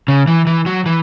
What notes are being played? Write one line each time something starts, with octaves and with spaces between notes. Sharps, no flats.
C#3
E3
E3
F#3
E3